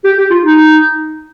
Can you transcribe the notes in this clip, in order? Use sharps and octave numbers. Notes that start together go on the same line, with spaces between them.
G4
G4
F4
D#4